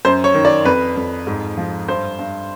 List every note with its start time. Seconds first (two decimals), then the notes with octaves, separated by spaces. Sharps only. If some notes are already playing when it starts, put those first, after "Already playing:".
0.05 F#2 C5
0.24 C#5
0.35 D#3
0.45 D5
0.65 F2 B4
0.96 F2
1.27 G#2
1.57 F3
1.88 G2 C5
2.19 G2